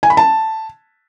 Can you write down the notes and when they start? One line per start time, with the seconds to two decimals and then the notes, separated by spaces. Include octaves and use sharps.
0.03 G#5
0.10 B5
0.17 A5